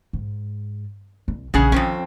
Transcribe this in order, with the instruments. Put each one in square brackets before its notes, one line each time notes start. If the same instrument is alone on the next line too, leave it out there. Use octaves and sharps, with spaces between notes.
[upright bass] G#2
C2
[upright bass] A#1 E3 [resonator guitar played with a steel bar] C#3 G#4 F#5
[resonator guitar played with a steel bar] F2 C4 C#4 [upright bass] D#3